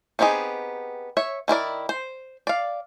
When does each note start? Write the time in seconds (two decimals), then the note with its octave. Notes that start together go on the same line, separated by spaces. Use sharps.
0.19 B3 C4 D#4 G4 G#4
1.17 C#5 E5
1.48 D#3 E4 A#4 D5
1.89 C5
2.47 D5 F5